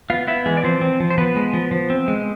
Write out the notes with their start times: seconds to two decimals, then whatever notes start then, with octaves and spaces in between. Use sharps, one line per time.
0.10 B3 F4 F5
0.27 B3 E4 E5
0.46 E3 G#3 G#4
0.57 D5
0.64 F3 C4 C5
0.81 C4
1.00 F3
1.10 C5
1.18 F3 B3 B4
1.36 G#3
1.53 F3
1.71 F3
1.90 C4
2.08 G#3